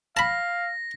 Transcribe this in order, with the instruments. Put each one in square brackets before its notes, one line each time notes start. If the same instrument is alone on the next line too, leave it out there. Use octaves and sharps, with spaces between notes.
[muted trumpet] F5 [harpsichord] A5 B5 [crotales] A#6